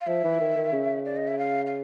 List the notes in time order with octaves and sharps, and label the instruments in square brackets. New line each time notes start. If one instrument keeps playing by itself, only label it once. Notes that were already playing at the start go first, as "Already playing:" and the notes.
[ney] F5
[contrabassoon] F3 [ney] E5
[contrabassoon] E3
D#3
D#3
C#3
[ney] D5
D#5
E5
F5
F5